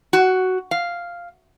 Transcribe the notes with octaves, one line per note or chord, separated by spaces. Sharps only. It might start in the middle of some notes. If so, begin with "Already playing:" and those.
F#4
F5